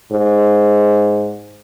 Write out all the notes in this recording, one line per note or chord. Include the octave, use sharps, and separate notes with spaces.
G#2